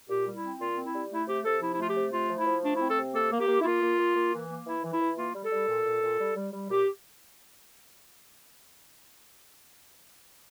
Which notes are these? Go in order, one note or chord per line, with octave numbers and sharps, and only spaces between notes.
A#2 G4
G3
E4
C4
A#2 F4
C4
E4
G3
A3 E4
C3 G4
C3 A4
F3 E4
E4
A3 F4
G4
C3
A3 F4
F3
E4
F3
A3 D4
E4
C4
A4
C3
A#3 A4
A#3
G4
A#3
E4
A#3 F4
A#3
A#3
A#3
E3
A#3
E3 E4
E3
E4
E3
A#3 F4
G3
A4
G3
A#2
A#2
A#2
G3
G3
G3
A#2 G4